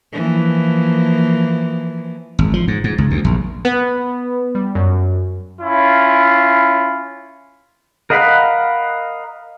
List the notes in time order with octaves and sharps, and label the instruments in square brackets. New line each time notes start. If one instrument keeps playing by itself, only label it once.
[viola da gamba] E3 F3 A#3
[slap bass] G#1
F3
G#2
G#2
C#2
D2
A#1
[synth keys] B3
G3
F#2
[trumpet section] C#4 E4 F4
[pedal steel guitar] A#4 D#5 F5 F#5 B5